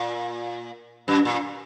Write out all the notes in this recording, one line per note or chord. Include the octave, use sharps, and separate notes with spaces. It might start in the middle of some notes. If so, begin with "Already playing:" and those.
Already playing: A#2
F#2
A#2